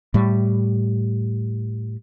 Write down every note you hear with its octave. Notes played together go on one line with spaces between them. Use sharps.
A2 G3